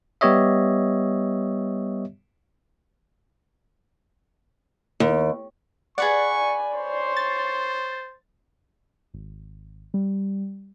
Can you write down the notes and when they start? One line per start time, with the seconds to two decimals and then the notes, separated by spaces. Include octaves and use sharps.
0.21 G3 B3 G4 C#5 D#5 E5
5.00 D#2
5.98 G#4 B4 D5 F#5 C#6
6.34 G#5
6.76 C5 C#5 C6
7.17 A6
9.14 G#1
9.94 G3